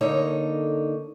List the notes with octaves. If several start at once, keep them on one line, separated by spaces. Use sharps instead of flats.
D3 A#3 D#4 A4 C#5